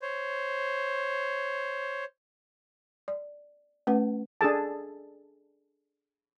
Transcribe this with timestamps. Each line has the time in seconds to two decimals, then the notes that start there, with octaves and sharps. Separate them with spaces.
0.02 C5 C#5
3.08 D5
3.87 A3 C#4 B4 F#5
4.41 D4 G#4 A4 A5